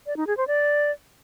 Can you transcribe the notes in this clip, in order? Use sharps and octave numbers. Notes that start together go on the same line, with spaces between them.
D5
D#4
G#4
C5
D5